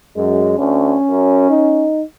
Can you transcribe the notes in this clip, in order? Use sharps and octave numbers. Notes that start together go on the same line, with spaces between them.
F#2 G#3
D2 C#4
F#2
D#4